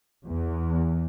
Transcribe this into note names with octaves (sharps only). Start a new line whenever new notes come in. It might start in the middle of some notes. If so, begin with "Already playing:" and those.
E2